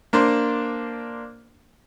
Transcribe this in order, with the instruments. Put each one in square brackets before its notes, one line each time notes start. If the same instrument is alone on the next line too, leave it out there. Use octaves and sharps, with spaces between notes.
[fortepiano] A#3 D4 C5